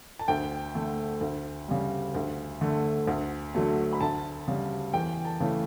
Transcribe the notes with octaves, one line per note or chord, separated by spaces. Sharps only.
A5
D2 G5
D3 A3
D2
C#3 G3
D2
D3 A3
D2
D3 F#3 A3
B5
D2 A5
C#3 G3
E2 G5
A5
C#3 E3 A3